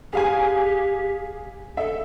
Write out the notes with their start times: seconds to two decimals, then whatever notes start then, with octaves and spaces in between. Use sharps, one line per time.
0.13 G4 G#4 F5 G#5
1.77 A4 E5